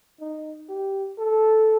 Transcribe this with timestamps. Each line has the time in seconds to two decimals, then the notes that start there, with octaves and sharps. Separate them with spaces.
0.20 D#4
0.69 G4
1.19 A4